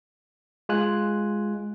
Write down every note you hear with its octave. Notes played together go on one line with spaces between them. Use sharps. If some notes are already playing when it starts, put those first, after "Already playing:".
G#3 F4 G#5 F#6